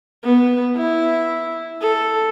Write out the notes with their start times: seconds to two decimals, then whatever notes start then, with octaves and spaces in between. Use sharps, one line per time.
0.24 B3
0.77 E4
1.82 A4